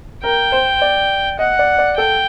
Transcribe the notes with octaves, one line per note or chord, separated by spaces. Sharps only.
A#4 G5
C5
D5
D#5 F#5
D5
D5
A4 G5